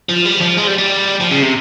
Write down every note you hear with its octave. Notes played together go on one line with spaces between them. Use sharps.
F3
G3
F3
G#3
G3
G3
F3
C#3
C3